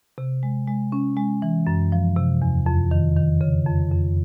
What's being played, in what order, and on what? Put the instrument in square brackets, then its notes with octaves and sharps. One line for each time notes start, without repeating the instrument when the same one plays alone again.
[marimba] C3
G#3
G#3
C#4
G#3
E3
F#2
F3
C3
E2
F2
D#3
D#3
C#3
F2
F2